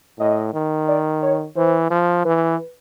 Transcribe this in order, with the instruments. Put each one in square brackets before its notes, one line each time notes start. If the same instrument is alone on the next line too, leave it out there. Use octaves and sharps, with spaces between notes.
[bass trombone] A2 [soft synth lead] D#5
[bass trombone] D#3
[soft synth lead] D5
C#5
[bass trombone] E3 [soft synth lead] C5
[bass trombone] F3
[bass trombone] E3 [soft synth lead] B4